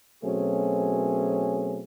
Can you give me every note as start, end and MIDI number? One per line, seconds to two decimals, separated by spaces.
0.23 1.84 47
0.23 1.84 54
0.23 1.84 57
0.23 1.84 60
0.23 1.84 61
0.23 1.84 68